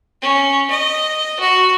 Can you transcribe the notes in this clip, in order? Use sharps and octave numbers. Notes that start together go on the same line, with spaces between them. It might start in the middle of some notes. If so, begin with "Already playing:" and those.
C#4
D#5
F#4